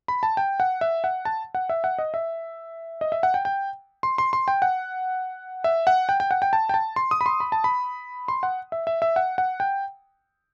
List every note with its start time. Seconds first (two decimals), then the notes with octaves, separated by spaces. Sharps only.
0.08 B5
0.23 A5
0.37 G5
0.60 F#5
0.81 E5
1.04 F#5
1.25 A5
1.55 F#5
1.69 E5
1.84 F#5
1.99 D#5
2.14 E5
3.01 D#5
3.12 E5
3.23 F#5
3.34 G5
3.45 G5
4.03 C6
4.18 C6
4.33 C6
4.48 G5
4.62 F#5
5.64 E5
5.87 F#5
6.09 G5
6.20 G5
6.31 F#5
6.42 G5
6.53 A5
6.69 G5
6.74 A5
6.96 C6
7.11 D#6
7.21 B5
7.26 C6
7.40 B5
7.52 A5
7.64 B5
8.28 C6
8.43 F#5
8.72 E5
8.87 E5
9.02 E5
9.16 F#5
9.38 F#5
9.60 G5